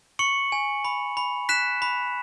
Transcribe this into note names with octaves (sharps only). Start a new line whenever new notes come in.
C#6 C#7 F#7
G#5
B5
B5
F#6 B6 E7
B5